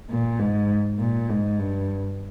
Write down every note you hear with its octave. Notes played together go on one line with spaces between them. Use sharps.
A#2
G#2
A#2
G#2
G2